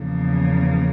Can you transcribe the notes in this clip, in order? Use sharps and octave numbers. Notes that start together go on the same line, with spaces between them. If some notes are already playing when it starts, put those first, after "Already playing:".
Already playing: E2 C#3 F3 A#3